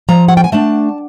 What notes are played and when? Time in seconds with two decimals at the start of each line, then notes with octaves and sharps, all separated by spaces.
0.09 F3 A#5
0.28 F#5
0.37 G5
0.44 G#5
0.52 A3 D4 A5